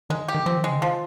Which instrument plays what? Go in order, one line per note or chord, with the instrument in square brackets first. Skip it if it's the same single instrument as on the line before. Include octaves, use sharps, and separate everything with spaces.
[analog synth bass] D#3 [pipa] G#3
[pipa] G4
[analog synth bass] D#3
[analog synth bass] F3 [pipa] C4
[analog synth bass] D#3
[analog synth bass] C#3 [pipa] G#3
[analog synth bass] D#3 [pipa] F3